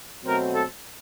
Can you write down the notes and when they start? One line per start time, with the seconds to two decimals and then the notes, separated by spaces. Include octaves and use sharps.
0.24 B2 F#3 A3 C4 A#4
0.53 A4